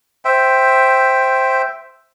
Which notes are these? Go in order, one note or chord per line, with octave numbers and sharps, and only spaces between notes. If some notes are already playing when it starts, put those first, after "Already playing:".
C5 E5 G5